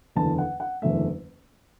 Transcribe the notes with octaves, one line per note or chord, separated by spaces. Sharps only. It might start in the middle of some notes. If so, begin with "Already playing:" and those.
F#1 E2 D3 A5
F#5
F#5
F#1 E2 D3 A3 E5